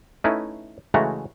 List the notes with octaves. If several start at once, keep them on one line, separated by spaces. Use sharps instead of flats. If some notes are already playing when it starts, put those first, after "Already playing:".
A3 C#4 D#4 E4 B4
C#3 E3 G#3 A3 F#4 A#5